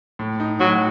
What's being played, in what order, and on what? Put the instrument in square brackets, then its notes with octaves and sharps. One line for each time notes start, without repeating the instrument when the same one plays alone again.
[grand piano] A2
D#4
[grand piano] A2 [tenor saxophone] F#3